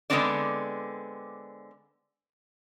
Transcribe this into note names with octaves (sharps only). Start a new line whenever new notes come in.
D3 G#3 B3 C4 D4 D5